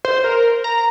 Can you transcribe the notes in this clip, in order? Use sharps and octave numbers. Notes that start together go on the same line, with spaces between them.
C5
A#4
A#5